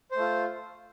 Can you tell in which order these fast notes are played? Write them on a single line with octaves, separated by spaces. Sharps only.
C5 A3 F4